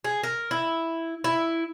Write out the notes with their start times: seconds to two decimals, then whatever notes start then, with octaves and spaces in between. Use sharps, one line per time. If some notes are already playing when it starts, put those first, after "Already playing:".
0.04 G#4
0.23 A#4
0.51 E4
1.24 E4